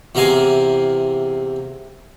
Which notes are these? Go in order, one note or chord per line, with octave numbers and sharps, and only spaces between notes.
E2 C3 A#4 F5 G#5